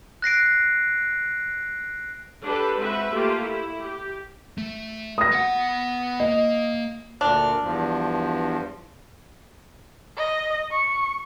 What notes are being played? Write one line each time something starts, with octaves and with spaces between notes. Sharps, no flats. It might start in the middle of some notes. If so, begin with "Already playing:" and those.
F#6 A#6 C7 D7
D4 G4 A4 B4
G#3 C4 F#4 B4 E5
A3 A#3 F4 G4
E4
G4
A3
D#6 A#6
B3 F#5
A#3 D#5
D2 A#2 D4 F6
E2 G2 F3
D#5
C#6